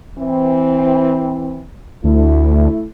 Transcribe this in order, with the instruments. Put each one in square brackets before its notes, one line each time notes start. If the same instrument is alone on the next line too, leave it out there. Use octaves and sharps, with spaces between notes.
[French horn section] E3 C4
[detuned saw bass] D2 [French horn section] A3 E4